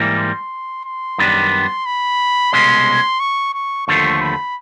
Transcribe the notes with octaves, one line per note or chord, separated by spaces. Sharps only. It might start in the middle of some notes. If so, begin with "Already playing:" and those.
Already playing: G#2 E3 G3 A#3
C6
C6
F#2 D#3 G3 B3 D4
B5
C2 B2 G#3 C#4 C6
C#6
C#6
D#2 D3 F3 A3 C#6
B5